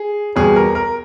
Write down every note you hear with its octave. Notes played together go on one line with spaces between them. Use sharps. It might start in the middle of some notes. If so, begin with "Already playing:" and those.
Already playing: G#4
E2 B2 G3 G#4
A#4
A#4